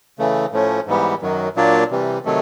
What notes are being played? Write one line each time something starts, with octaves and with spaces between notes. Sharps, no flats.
C#3 E3 A3
A2 F3 A3 C#4
G#2 E3 G3 B3
F#2 D#3 F#3
A#2 F#3 A#3 D4
C3 E3 G3
C3 D#3 F#3 A3